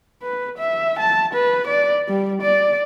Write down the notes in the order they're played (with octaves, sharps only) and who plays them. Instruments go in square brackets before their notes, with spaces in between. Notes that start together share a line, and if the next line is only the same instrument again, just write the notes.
[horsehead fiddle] B4
E5
A5
B4
D5
G3
D5